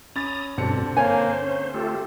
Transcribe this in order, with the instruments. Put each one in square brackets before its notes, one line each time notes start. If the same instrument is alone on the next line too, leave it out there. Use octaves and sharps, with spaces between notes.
[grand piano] C#4 B5 A6 [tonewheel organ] A#5 D#6
[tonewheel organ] G2 B2 D4 [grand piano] D3 C4 C#7 [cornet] A5
[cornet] A#3 [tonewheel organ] C5 [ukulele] C#5 G#5
[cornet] C#4
[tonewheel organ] A3 F4 A4 [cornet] G4